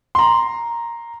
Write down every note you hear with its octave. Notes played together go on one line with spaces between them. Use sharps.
A#5 C6